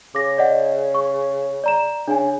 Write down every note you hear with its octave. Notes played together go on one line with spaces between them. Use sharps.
C#3 D6 A#6
D5 D#5 F#5
C#6
D5 A#5 E7
C#3 D4 G#5